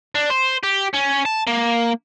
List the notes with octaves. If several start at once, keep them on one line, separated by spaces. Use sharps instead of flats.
D4
C5
G4
C#4
A5
A#3